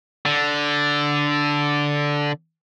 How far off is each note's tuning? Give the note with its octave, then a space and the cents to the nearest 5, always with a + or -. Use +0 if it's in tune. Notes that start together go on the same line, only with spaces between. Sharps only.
D3 -5